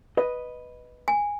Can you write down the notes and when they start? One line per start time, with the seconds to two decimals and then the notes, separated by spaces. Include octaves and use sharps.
0.17 B4 D#5
1.08 G#5